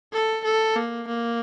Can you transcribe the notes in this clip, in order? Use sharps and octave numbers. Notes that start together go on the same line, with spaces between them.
A4
A4
A#3
A#3